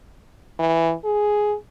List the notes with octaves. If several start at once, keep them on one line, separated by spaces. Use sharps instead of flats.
E3
G#4